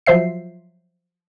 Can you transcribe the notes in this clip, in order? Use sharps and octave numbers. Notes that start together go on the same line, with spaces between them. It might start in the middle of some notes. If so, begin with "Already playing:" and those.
F3 F#3 C5 E5 C7